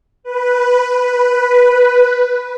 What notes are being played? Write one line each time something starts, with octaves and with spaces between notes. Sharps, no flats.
B4
B4